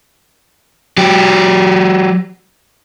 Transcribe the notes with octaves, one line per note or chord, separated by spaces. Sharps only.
F#3 G4